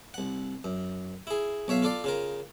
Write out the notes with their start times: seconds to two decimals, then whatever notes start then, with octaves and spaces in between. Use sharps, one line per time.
0.14 C2 F#5
0.64 F#2
1.27 E4 G#4
1.68 B1 C#5 E5 F5
1.82 F4 A4 D5 F5
2.04 C#3 F4 A#4